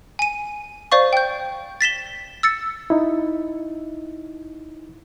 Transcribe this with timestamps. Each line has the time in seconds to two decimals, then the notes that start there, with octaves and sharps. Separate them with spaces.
0.19 G#5 D#7
0.92 C5 D5 F5 C#6
1.13 G5 G6
1.81 A6 B6 E7 G7
2.43 E6 A6 C#7
2.90 D#4 E4